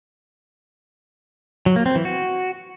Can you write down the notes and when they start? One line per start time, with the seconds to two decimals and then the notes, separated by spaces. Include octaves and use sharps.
1.66 F#3
1.76 A#3
1.86 C4
1.95 E3
2.05 F#4